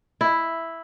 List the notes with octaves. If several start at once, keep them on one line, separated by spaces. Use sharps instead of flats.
E4